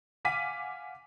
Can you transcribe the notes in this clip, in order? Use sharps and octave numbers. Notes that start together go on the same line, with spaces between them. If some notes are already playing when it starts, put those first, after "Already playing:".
F5 F#5 G#5 D6 B6 D#7